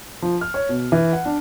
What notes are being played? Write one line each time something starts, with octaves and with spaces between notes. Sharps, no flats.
F3
F6
C#5
B2
E3
F#5
D4